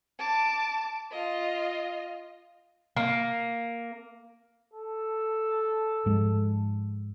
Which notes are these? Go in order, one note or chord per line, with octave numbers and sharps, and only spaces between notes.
A5 D6
F4 D#5
A#3
A4
G#2 F3 G#3